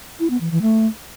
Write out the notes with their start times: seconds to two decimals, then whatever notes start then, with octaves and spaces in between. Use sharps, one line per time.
0.20 E4
0.30 B3
0.41 E3
0.51 E3
0.62 A3